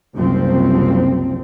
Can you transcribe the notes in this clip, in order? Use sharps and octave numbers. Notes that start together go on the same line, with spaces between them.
F#1 C2 F3 C4